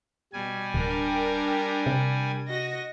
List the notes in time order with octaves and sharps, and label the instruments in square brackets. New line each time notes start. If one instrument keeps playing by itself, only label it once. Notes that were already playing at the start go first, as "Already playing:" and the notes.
[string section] B2 [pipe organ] G3 G#5
[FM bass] D1 [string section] D4 G4 A#4
[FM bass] C3
[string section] F#4 D#5 A#6